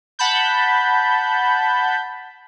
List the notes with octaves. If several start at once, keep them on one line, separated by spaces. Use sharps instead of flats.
F#5 A5 B5 G6